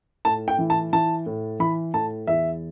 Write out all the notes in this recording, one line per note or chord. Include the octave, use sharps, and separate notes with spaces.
A2 A5
G5
E3
A5
E3 A5
A2
E3 B5
A2 A5
E2 E5